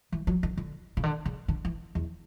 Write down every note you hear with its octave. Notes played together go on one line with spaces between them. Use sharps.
E3
F#3
D3
D3
C#3
D3
C#3
D3
E3
E2